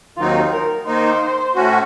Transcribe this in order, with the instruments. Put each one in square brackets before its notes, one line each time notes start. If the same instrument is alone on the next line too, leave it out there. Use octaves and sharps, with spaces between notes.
[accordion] D#2 D#3 F#3 C4 D#4 [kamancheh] F4
[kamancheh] A#4
[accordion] D#3 A#3 D#4 [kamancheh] C5
[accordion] A2 A3 C#4 F#4